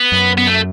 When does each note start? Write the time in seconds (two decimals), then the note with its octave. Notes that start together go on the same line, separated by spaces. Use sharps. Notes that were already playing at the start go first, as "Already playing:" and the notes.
Already playing: B3
0.12 F#2
0.38 B3
0.47 A3